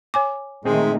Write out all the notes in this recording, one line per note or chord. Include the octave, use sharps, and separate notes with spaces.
C#5 G#5 D6
A#2 D#3 G#3 A3 C4 G#4